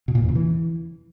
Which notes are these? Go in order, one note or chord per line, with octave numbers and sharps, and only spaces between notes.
B2
A#2
E2
C#3
E3